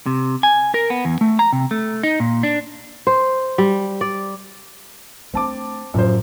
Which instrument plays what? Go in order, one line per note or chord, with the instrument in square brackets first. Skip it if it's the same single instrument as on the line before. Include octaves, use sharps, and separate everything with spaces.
[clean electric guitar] C3
G#5
A#4
B3
E2
A3
A#5
C3
A3
D#4
A#2
D4
[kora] C5
G3
D5
[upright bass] A3 D4 [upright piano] C4 A5 D6
[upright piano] F#2 F3 C5 [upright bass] A2 F#3